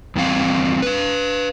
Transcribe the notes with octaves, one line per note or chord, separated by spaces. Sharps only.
E2 G3 C4 F5
B4 F5